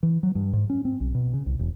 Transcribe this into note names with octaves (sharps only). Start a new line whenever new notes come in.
E3
F#3
G2
G#2
C#4
C4
B1
B2
C#3
C2
E1